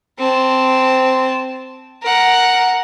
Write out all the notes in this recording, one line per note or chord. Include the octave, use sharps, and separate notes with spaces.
C4 A5
A#4 F#5